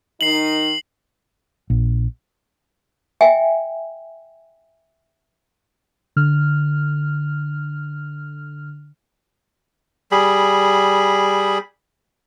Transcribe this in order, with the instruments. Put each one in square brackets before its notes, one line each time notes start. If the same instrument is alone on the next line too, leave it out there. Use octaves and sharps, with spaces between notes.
[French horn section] D#3 D#4 [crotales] C7 F#7
[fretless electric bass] A#1
[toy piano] E5 G5 G#5
[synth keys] D3 F6
[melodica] G3 G#4 B5